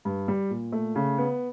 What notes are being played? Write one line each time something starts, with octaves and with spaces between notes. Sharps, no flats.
G2
G3
A#2
A3
C#3
B3